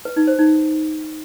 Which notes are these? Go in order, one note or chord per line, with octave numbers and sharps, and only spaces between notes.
B4
D#4
C5
D#4